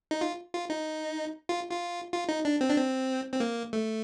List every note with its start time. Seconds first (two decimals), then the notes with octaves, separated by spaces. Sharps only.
0.11 D#4
0.21 F4
0.53 F4
0.70 D#4
1.49 F4
1.71 F4
2.12 F4
2.29 D#4
2.45 D4
2.61 C4
2.70 D4
2.76 C4
3.32 C4
3.40 A#3
3.73 A3